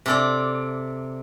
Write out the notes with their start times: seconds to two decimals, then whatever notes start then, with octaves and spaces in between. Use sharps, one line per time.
0.06 C3 A4 D5